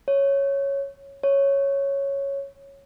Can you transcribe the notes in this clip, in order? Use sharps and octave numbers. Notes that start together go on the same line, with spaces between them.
C#5
C#5